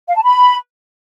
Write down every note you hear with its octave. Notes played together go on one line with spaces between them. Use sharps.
F5
A5
B5